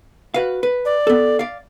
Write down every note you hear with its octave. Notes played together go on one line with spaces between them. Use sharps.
F#4 B4 F5
B4
D5
B3 A4
D5 F5